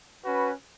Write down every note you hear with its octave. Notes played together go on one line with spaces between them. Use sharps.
C#4 F#4 B4